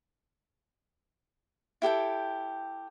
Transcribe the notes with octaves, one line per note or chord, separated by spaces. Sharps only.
E4 G4 A4 G5